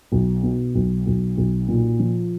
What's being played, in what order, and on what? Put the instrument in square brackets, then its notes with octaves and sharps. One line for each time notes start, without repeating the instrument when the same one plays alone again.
[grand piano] B1
B2
B1
B1
B1
A#2
F3